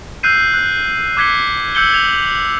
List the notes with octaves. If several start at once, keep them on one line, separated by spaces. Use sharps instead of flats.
E6 F#6 G6 C7 D#7
F#6
D6 F#6 G#6 B6 C#7 G7
E6 F#6 G6 C#7 F#7 G7
G#6 F7